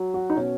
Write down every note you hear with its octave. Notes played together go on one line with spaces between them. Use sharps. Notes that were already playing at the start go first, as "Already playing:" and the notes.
Already playing: F#3
F#4
D#4
B2 C#4